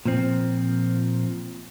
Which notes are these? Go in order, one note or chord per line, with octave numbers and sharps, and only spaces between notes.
A#2 F3 C4